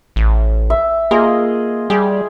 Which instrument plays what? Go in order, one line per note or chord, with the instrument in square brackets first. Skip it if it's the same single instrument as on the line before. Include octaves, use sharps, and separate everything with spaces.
[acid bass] A1
[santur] E5
[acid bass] A#3 [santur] F4 G#4 D#5
[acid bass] G3 [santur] G#4